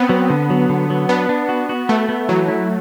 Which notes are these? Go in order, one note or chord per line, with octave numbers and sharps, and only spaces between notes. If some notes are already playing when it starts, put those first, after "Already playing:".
Already playing: B3 C4
F#3
D3
F#3
D3
F#3
B3 D4
D4
F#4
F#4
A3 B3
B3
E3 F#3
E4